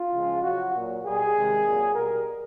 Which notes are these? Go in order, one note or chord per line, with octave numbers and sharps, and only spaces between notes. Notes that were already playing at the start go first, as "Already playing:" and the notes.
Already playing: F4
C#3 F3 G#3
C#3 F#3 F#4
A#2 F#3
B2 G3 G#4
C3 D#3 G#3
A#2 F#3
B2 G3 A#4